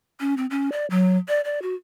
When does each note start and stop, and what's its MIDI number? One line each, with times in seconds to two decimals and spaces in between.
0.20 0.37 61
0.37 0.46 60
0.51 0.70 61
0.72 0.86 74
0.90 1.18 54
1.28 1.41 74
1.45 1.62 74
1.62 1.74 66